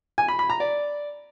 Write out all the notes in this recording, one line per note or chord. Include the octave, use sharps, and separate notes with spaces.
G#5
B5
B5
A#5
D5